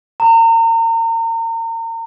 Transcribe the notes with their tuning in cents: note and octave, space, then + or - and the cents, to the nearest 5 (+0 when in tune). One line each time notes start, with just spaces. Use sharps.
A#5 -35